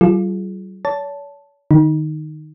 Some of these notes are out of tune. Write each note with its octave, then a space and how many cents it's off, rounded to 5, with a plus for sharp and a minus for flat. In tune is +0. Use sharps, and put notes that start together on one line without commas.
G3 -45 F4 -15 G#4 +35
C#5 +40 A5 +0
D#3 -25 D#4 +0